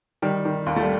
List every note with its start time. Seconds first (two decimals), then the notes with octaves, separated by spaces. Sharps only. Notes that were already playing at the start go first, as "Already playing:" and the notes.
0.22 D#3 G3
0.45 D#3
0.66 D#2
0.76 A3
0.82 G3